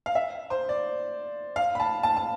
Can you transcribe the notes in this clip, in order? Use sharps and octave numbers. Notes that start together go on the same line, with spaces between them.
F5
E5
C5
D5
F5
B5
A5
A5
A5